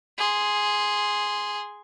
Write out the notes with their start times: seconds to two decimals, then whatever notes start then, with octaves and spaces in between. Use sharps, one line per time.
0.18 G#4 C6